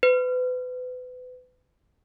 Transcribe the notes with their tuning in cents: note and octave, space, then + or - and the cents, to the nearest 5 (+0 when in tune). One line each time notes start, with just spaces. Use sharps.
B4 +30